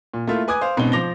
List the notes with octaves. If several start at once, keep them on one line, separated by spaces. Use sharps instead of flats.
A#2
A3 A#3 E4 F4 E5
B4 G#5 D6 D#6 G#6
C5 F5
G#2 B2 C4 C#4 G7
F3 C5 D6 A#6 F7 G7